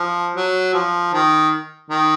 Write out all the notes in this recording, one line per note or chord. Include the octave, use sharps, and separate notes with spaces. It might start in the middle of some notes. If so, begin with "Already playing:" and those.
Already playing: F3
F#3
F3
D#3
D#3